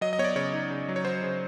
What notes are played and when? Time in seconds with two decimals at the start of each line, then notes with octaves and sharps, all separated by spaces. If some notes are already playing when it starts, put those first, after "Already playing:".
0.01 F#3 D#5
0.13 D#5
0.18 B3 C#5
0.24 D5
0.36 C#3 C#5
0.53 D#4
0.70 C#3
0.89 F#3
0.96 C#5
1.05 F#3 C5
1.23 C#3